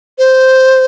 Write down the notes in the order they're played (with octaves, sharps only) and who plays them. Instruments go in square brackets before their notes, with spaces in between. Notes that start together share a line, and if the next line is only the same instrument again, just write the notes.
[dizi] C5